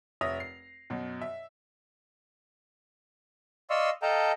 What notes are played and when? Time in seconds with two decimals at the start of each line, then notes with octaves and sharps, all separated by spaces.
0.21 F1 C#5 E5 D#6 A#6 F7
0.40 C7
0.90 F#2 B2
1.21 E5
3.70 D5 D#5 F5 C6 C#6 E6
4.02 A4 D#5 F5 G5 A5 A#5